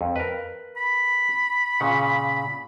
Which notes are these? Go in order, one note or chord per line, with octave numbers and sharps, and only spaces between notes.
F2
A#4 B4
B5
A#2 C#3 F#5